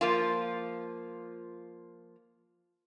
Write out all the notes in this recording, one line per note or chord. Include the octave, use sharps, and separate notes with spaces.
F3 A#3 F4